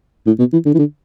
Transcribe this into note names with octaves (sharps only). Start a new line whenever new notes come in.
A2
B2
E3
D3
E3
D3